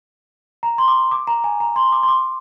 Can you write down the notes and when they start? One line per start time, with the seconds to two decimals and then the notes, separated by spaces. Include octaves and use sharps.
0.63 A#5
0.78 C6
0.88 D6
1.11 D6
1.27 A#5
1.44 G#5
1.60 A#5
1.76 C6
1.92 D6
2.03 C6
2.08 D6